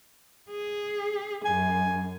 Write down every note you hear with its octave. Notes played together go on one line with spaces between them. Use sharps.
G#4
F#2 G#5